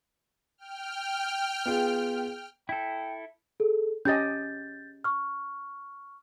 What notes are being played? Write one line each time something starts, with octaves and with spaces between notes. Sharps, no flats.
G5 F6
B3 F4 G#4
E4 A4 G5
G#4 A4
C#4 G4 D#5 G6 A6
C#6 F6